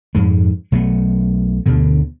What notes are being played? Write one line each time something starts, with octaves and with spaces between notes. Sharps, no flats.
F2 G#2 G#3
B1 F#3 A3 B3
D2 G2 B2 D3